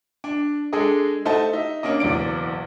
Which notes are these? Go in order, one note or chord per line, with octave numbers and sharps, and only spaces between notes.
D4
G#3 D4 G#4 A4 D#5
A3 D#4 C5 F#5 A5
D#4 E5
A#3 C#4 D4 D#5
F#1 B1 E2 D5 D7